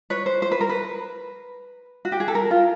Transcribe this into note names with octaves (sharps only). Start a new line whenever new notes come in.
B4 C#5
C5
C5
B4
A#4
B4
F#4
G4
G#4
A4
A#4
F4